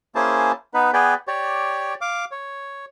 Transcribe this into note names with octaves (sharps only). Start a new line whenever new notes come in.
A#3 C#4 E4 G#4 C5 A5
B3 D#4 B4
B3 G#4 B4 D5 G5
G4 C#5 D5
F5 D6
C#5